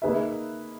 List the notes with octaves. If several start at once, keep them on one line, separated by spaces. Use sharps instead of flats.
A#3 D#4 G#4 B4 E5